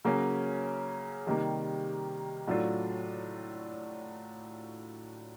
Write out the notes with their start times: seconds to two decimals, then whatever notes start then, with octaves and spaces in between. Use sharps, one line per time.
0.05 C#3 F#3 A#3 C#4
1.26 C3 D#3 G3 A#3
2.47 A2 F#3 A3 D4 F4